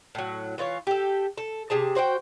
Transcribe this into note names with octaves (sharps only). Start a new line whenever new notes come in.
A2 F#3
E3 F4 C5 C#5
G4 A4
A4
C3 G4 G#4 A5
F#4 C5 D5 G5